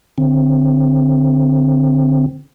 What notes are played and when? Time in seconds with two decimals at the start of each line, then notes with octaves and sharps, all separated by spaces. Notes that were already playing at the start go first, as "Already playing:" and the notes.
0.18 D3 C4